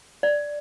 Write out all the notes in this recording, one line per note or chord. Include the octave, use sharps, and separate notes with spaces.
D5